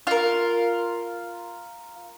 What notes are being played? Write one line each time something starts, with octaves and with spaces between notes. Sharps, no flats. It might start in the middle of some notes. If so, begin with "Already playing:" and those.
F4 A#4